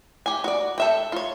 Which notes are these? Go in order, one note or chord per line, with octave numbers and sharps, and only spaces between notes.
G4 G#5
F#4 D5
A4 E5 G5
F4 C#5